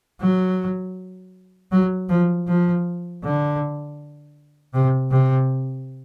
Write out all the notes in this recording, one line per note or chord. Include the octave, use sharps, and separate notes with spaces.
F#3
F#3
F3
F3
D3
C3
C3